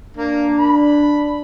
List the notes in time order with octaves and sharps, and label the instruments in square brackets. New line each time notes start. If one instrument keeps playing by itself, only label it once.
[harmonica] A#3 [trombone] D4
[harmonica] B5